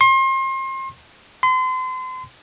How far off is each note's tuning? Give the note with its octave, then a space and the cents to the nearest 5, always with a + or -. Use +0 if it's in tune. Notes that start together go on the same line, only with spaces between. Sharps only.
C6 +35
C6 -35